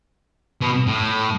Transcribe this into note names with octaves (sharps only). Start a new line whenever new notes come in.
B2
A2